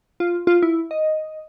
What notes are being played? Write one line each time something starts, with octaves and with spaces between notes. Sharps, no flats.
F4
F4
E4
D#5